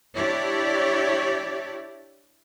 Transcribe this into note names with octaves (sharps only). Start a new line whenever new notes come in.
D4 E4 G4 C#5 D5